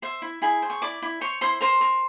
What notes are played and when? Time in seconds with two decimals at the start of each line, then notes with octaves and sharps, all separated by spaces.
0.02 C5 E5
0.22 E4
0.42 E4 G#4 G#5
0.62 C5
0.70 C#6
0.82 E4 D5 D6
1.02 E4
1.21 C5 C#5 C#6
1.41 E4 C5 C6
1.61 A#4 C5 C6
1.81 A#4